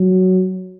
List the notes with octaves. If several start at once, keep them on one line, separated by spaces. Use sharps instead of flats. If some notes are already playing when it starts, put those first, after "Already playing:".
Already playing: F#3